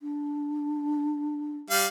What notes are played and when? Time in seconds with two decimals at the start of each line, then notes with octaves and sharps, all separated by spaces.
0.01 D4
1.70 G3 F5